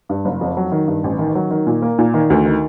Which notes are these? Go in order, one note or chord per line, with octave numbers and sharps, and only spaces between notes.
G2
F#1
F2
F#3
D#3
G2
A1
D#3
F#3
D#3
A#2
A#3
A#2
D#3
D2
D#3